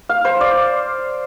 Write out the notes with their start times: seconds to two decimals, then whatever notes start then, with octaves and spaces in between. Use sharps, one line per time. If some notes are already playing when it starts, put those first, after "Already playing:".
0.09 F5
0.25 C5
0.41 D5